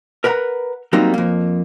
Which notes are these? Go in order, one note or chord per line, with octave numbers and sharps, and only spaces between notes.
A#4 B4 F#5 A#5
F#3 G3 A#3 C4 D#4
F2 A#3